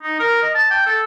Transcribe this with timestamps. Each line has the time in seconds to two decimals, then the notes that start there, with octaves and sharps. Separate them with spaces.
0.03 D#4
0.20 A#4
0.42 D#5
0.55 A5
0.70 G5
0.86 A4